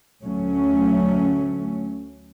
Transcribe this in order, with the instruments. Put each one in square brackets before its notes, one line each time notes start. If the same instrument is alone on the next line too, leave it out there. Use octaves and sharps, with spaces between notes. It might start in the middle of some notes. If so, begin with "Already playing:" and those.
[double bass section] D2 F#3 A3 C#4